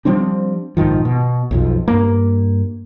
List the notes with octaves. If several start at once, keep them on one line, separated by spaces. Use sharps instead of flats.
F3 G3 C4 D4
A#1 G#2 D#3 F3
B2
B1 F2 F3
G2 A#3